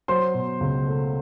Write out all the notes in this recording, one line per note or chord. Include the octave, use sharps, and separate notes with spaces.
F#3 C5 C6
B2
C#2
A3